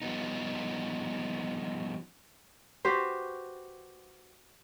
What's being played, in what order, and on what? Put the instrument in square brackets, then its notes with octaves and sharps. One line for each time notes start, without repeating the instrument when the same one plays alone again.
[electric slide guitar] F3 G3 B3 D#4
[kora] F#4 G4 B4 C5